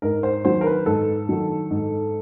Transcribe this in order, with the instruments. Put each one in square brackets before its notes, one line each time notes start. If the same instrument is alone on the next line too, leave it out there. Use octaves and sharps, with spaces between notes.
[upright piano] G#2 A#4
C5
D#3 F#3 C5
A#4
B4
G#2 A4
D#3 F#3
G#2